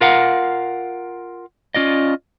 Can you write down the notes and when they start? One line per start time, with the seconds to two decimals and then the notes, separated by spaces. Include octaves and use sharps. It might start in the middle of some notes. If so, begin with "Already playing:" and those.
0.01 F4 A#4 F5 F#5
1.75 C#4 F4 D5 D#5